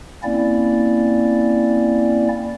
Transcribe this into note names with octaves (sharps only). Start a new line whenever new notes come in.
A#3 C4 C#4 E4 D5